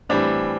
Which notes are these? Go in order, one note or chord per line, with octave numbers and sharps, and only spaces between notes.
A2 E3 G3 C4 D4